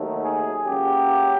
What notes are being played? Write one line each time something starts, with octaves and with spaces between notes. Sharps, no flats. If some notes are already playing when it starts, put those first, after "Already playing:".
Already playing: D#2 D#3 F#3 A3
G#4
C#2 C#3 F#3 A#3 G4